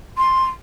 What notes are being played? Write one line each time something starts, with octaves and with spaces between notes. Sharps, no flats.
C6